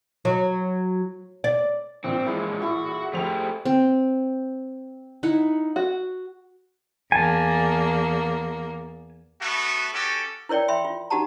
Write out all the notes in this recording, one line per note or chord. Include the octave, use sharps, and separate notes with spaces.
F#3
D5
A1 G2 A#2 C4
F3 G#3 E4 F4 A4
E4 F#4 G#4 A4
F2 A3 G4 C5 F7
C4
D#4 E4 F#5
F#4
E2 A#3 G#5 A5
A3 B3 F#4
C#4 F#4 G4 A4
E4 A#4 C#5 D5 G5
E5 G5 B5 C6
F4
D#4 F#4 G4 F#5 A5 A#5